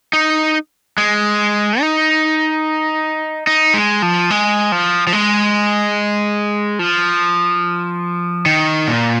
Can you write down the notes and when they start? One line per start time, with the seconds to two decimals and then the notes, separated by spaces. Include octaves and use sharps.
0.13 D#4
0.98 G#3
1.81 D#4
3.47 D#4
3.74 G#3
4.02 F3
4.30 G#3
4.72 F3
5.07 F3
5.13 G#3
6.79 F3
8.46 D#3
8.88 A#2